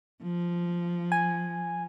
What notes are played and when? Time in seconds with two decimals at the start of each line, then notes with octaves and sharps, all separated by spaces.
0.23 F3
1.12 G#5